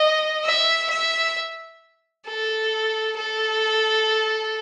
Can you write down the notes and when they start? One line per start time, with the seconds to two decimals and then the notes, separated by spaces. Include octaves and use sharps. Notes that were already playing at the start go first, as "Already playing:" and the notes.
Already playing: D#5
0.45 E5
0.90 E5
2.26 A4
3.18 A4